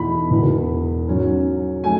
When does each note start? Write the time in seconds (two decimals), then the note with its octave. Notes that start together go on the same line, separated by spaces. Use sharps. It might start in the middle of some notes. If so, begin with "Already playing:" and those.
Already playing: E2 B2 A3 D#4 B5
0.31 E1 E2 B2
1.07 G#2 F#3 C#4
1.84 F#3 A3 D#4 G#5